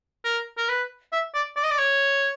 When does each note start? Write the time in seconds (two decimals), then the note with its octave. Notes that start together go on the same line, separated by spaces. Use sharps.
0.24 A#4
0.57 A#4
0.69 B4
1.12 E5
1.34 D5
1.56 D5
1.64 D#5
1.71 D5
1.79 C#5